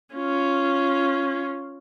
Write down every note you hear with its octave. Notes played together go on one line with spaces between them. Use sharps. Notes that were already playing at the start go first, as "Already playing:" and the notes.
C#4 F4